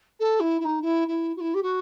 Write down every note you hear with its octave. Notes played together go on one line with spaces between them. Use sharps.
A4
E4
E4
D#4
E4
E4
F#4
E4
G4
F#4